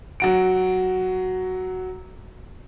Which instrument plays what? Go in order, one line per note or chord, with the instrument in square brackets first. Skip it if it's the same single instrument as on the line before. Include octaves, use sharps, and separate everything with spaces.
[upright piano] F#3 F#4 D7